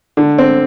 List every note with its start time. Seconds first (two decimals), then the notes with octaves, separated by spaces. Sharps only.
0.17 D3
0.38 C4